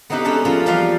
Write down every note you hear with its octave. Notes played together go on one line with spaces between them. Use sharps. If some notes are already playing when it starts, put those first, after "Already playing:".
B3 C4 D#4 E4 G4 B4
G#3 C#4 D4 A4 E5
F3 A#3 C#4 F4
E2 F3 G3 F4 D5 F5